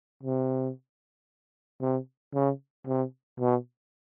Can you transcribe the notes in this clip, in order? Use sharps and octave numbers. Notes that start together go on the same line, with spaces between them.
C3
C3
C#3
C3
B2